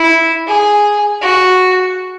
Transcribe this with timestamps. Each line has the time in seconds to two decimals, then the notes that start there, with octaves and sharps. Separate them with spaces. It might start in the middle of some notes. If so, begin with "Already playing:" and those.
Already playing: E4
0.47 G#4
1.21 F#4